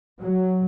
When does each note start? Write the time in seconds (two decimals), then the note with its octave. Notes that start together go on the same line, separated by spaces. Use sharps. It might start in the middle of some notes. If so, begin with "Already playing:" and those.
0.20 F#3